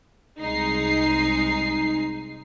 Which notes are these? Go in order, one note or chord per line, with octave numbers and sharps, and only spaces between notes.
C2 G#3 D#4 C7